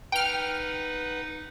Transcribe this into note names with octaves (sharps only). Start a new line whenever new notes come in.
D#4 B4 F#5 G5 F6